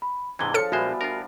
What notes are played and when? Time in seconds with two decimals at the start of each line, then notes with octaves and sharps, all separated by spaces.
0.02 B5
0.39 G#2 C3 E3 D4 G#4 G#6 G7
0.54 F3 A4 C#5 F5 A5 C#7
0.72 A#1 G3 G#3 B3 F#4 C5 E5 G#5
1.01 D4 F4 A#4